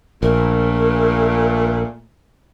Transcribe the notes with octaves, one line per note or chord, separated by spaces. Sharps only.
A#1 A#2 A3 A#4